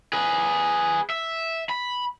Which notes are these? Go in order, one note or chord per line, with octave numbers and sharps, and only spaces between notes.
G#4 B4
E5
B5